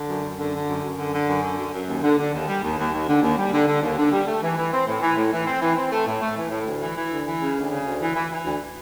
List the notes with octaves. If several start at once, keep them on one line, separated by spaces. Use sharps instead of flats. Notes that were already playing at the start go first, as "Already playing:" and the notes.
Already playing: D3
F#2
F#2
D3
D3
F#2
F#2
D3
D3
F#2
D3
F#2
F#2
D#2
D3
D3
D#2
G3
D#2
D#2
D#2
D3
D#2
G3
D3
D3
D#2
D3
G3
A3
E3
E3
C4
A2
E3
A2
E3
C4
E3
C4
A3
A2
A3
E3
A2
D2
E3
E3
D2
E3
C#3
D2
C#3
D2
E3
E3
E3
D2